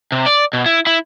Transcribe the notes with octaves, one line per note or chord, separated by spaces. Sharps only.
C3
D5
B2
E4
E4